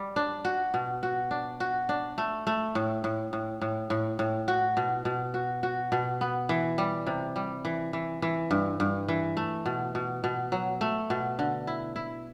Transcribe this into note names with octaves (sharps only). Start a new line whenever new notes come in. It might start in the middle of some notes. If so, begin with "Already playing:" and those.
Already playing: G3
D4
F#4
B2
F#4
D4
F#4
D4
A3
A3
A2
A2
A2
A2
A2
A2
F#4
B2
B2
F#4
F#4
B2
B3
E3
G3
C3
G3
E3
E3
E3
G2
G2
E3
A3
B2
B2
B2
F#3
A3
B2
D3
E4
E4